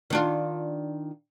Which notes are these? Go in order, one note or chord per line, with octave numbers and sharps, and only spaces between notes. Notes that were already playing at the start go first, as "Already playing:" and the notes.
D#3 D4 F4